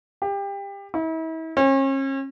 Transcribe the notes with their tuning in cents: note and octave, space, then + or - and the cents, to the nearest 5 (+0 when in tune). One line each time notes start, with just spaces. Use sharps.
G4 +25
E4 -40
C#4 -40